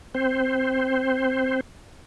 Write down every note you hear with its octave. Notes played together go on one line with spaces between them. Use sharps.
C4 C5